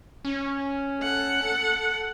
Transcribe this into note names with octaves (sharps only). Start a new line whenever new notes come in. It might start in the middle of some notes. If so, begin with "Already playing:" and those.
C#4
A4 F#5